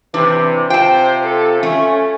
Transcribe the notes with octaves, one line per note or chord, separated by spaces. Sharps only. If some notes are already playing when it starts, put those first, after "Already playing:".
C3 E3 D4
C3 F4 C5 G5 A5
A4
A3 C#4